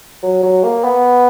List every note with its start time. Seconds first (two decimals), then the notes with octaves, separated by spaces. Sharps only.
0.23 F#3
0.43 F#3
0.64 A#3
0.84 B3